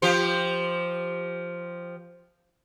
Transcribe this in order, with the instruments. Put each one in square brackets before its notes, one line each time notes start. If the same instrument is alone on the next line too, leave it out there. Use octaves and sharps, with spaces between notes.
[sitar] F3 G4 C5